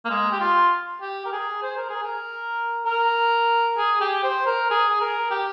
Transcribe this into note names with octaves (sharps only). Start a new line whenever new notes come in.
A#3
G#3
G4
F4
G4
A#4
G#4
C5
A#4
G#4
A#4
A#4
G#4
G4
C5
A#4
G#4
A#4
G4